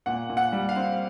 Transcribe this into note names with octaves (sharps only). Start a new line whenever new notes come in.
A#2 F#5
A#2
F#5
G3
F5
C4